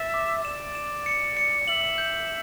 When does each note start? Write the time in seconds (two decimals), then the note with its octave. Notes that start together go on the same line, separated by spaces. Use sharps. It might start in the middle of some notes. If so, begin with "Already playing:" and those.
Already playing: E5 A6
0.14 D6
0.44 D5 E7
0.75 E7
1.06 C#7
1.37 C#7
1.67 E5 F#7
1.98 G6